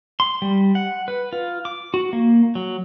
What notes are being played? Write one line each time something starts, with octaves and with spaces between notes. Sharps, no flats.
C6
G3
F#5
B4
F4
D6
F#4
A#3
F#3